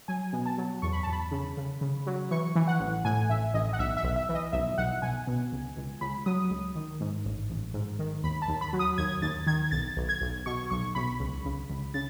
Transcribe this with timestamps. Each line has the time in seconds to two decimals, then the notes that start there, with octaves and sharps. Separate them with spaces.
0.08 F#3 G#5
0.33 B2
0.46 A5
0.58 F#3
0.82 E2 C#6
0.93 B5
1.03 E2 A5
1.13 B5
1.31 C#3
1.57 C#3
1.81 C#3
2.06 F#3
2.31 E3 C#6
2.56 E3
2.68 F#5
2.80 A1
3.05 A2 G#5
3.29 A1 E5
3.54 A1 D#5
3.73 F#5
3.79 B1 E5
3.97 E5
4.03 B1
4.16 E5
4.29 E3
4.35 D#5
4.53 B1 E5
4.78 B1 F#5
5.02 B1 G#5
5.27 B2
5.52 C#2
5.77 C#2
6.01 C#2 B5
6.26 F#3 D#6
6.50 C#2
6.75 D#3
7.00 G#2
7.25 A1
7.50 A1
7.74 G#2
7.99 D#3
8.23 D#2 B5
8.42 A5
8.48 D#2
8.61 B5
8.73 F#3
8.79 D#6
8.98 D#2 G#6
9.22 D#2 A6
9.47 D#3 G#6
9.71 B1 A6
9.97 B1
10.09 G#6
10.21 B1
10.46 B2 C#6
10.70 B1 C#6
10.95 B1 B5
11.19 C#2
11.45 C#2
11.70 C#2
11.94 C#3 A6